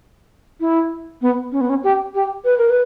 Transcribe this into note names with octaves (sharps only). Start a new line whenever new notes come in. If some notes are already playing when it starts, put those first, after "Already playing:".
E4
B3
C#4
B3
C#4
G4
G4
B4
A#4
B4